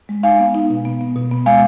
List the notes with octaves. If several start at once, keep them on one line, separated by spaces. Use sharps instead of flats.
G#3
D#4 F5 G#5
B3
D#4
B2
B3
B3
B2
B3
G#3 F5 G#5